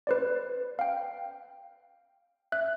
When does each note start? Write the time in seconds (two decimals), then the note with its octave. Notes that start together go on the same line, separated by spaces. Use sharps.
0.07 B4 C5 D5
0.79 F5 G5
2.52 E5 F#6